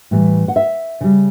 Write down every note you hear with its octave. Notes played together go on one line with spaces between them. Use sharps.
A2 E3 G3
F#5
E5
C#3 G3